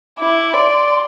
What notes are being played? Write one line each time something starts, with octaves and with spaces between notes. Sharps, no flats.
E4 D6
D5 C6